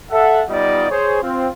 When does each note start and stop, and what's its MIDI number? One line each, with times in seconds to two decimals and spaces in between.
0.11 0.42 69
0.11 0.42 76
0.11 0.42 78
0.49 0.86 55
0.49 0.86 59
0.49 0.86 63
0.49 0.86 65
0.49 0.86 74
0.49 0.86 75
0.90 1.20 68
0.90 1.20 72
0.90 1.20 73
1.23 1.49 60
1.23 1.49 65